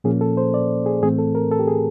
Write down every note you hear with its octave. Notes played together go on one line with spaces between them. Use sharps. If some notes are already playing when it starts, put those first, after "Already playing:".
A#2 F3 A#3 C#4 G#4
A4
C5
D5
G#4
A2 E3 A3 C4 G#4
A4
A#4
A4
G4
G#4